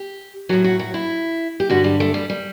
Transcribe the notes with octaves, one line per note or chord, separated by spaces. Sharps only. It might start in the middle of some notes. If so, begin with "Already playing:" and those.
Already playing: G4
A2 F#3 F#4
F#4
F#4
E4
G4
G2 D3 G3 F#4
G3
A3
G3
G3